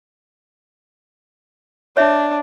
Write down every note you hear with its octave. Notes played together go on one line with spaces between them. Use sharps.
D4 C#5 E5